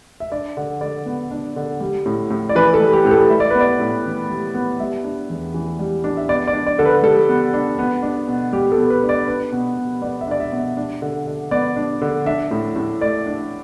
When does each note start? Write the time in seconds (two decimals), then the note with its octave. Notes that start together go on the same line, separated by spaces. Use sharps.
0.20 E5
0.32 D4 D5
0.57 D3
0.81 D3 D5
1.06 B3
1.31 D4
1.56 D3
1.81 G3
2.06 A2
2.30 A2
2.49 D5
2.55 E3 B4
2.74 A4
2.80 G3
2.93 G4
3.05 A2 G4
3.11 A4
3.30 G3 E5
3.40 D5
3.50 B3 B4
3.61 D5
3.80 A2
4.06 E3
4.30 G3
4.55 B3
4.80 G3 E5
5.04 D4
5.30 E2
5.54 E3
5.79 G3
6.04 D4
6.17 E5
6.28 B3 D5
6.47 D5
6.53 D4
6.66 D5
6.79 D3 A4
6.85 B4
7.03 G3 A4
7.29 B3
7.53 D4
7.79 B3
8.03 D4
8.28 B2
8.53 G3 G4
8.72 A4
8.78 B3
8.90 B4
9.03 D4
9.09 D5
9.28 D4 B4
9.53 B2
9.77 B2
10.02 B3 D5
10.21 E5
10.27 D4 D5
10.40 E5
10.52 B2
10.58 E5
10.77 D4
11.02 D3
11.27 D3
11.51 B3 D5
11.76 D4
12.01 D3
12.26 D4 E5
12.51 A2
12.76 A2
13.01 A3 D5
13.26 D4